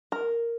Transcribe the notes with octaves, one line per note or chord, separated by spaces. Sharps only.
A#4